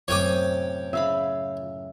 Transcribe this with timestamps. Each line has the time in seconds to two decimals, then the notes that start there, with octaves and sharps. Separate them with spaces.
0.08 F#2 A2 C3 C#5 D#5 G5 G#5 D6
0.93 C#3 E5 F5 B5